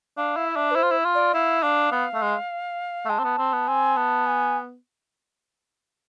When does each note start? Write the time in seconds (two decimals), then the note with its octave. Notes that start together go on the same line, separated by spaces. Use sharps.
0.17 D4 F5
0.36 E4
0.46 E5
0.56 D4
0.71 B4
0.75 E4 C5
0.83 F4
0.91 E4
1.05 F4
1.14 D5
1.34 E4 F5
1.62 D4 F5
1.92 B3
2.14 A3
2.22 G#3
3.05 A3
3.09 G#3 A5
3.19 C4
3.24 B3
3.38 C4
3.53 B3
3.67 C4 G#5
3.96 B3 A5
4.26 G#5